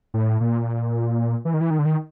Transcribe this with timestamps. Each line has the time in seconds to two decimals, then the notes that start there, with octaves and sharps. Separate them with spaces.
0.14 A2
0.41 A#2
1.45 E3
1.54 D#3
1.61 E3
1.70 D#3
1.79 D3
1.85 D#3